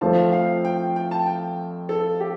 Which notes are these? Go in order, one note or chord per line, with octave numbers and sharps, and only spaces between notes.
F2 F3 A3 F4 C5 A5
F5
G5
G5
A5
G5
A4
G4